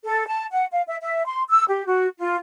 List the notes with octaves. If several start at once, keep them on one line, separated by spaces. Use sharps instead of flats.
A4
A5
F#5
F5
E5
E5
C6
E6
G4
F#4
F4